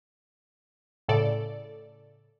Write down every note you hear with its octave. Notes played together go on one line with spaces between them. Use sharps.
A2 C#3 A4 D5